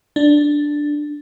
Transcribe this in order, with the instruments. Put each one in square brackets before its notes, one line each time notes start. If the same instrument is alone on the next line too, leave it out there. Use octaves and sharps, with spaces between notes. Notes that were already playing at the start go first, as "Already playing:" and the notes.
[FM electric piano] D4